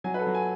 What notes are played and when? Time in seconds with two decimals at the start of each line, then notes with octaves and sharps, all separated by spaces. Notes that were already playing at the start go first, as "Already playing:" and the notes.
0.04 F#3 G#5
0.14 B4
0.19 A4
0.27 F#3
0.34 G#5